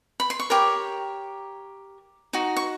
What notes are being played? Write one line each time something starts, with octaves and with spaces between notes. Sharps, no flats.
B5
C6
C#6
G4 A#4 C#5 D6
D#4 F#4
C#6